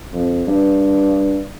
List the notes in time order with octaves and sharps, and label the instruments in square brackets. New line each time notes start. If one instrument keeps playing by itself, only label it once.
[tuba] F2
G2